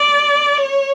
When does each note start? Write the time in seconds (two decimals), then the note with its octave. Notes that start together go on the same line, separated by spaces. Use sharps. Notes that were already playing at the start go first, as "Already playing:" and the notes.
Already playing: D5
0.58 C#5